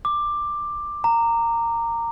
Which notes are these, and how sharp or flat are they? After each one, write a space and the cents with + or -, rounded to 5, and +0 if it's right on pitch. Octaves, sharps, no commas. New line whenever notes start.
D6 +10
A#5 -15